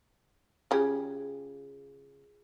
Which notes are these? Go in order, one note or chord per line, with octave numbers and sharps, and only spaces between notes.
C#3 F4 G4 G#4